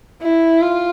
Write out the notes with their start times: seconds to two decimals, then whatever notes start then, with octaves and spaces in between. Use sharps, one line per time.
0.22 E4
0.61 F4